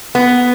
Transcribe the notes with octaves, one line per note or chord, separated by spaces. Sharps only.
B3